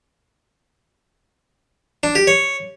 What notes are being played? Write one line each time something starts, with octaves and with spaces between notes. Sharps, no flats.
D4
G4
C#5